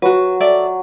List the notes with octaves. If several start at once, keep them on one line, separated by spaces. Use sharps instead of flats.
F#3 F#4 B4
A4 D5 E5